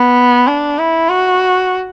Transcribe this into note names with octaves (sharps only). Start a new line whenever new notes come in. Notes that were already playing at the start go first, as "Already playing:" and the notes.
Already playing: B3
D4
E4
F#4